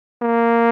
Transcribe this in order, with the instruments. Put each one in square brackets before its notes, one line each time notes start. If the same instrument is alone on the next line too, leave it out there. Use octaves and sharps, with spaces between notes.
[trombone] A#3